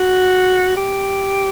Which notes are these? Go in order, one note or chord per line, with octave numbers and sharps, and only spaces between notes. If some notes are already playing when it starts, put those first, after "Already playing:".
Already playing: F#4
G4